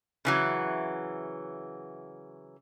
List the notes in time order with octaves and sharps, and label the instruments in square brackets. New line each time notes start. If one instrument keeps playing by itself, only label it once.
[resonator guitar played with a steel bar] C#3 E3 F#3